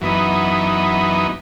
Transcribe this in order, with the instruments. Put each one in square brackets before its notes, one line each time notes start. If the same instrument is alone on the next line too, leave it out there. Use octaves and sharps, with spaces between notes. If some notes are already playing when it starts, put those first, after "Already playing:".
[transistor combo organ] F#2 E3 B3 D#4